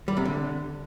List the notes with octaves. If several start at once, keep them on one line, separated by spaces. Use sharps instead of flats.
G3
C3
D3